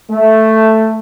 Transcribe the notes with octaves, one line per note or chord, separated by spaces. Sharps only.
A3